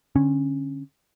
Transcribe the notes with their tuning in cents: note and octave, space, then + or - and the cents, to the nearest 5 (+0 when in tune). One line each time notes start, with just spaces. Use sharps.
D3 +0 C#4 -20